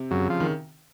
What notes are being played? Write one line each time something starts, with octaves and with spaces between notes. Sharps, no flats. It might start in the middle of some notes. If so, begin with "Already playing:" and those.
Already playing: C3
F#2 C#3
F3
D#3